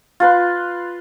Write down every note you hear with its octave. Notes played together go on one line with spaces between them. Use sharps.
F4 B4 C6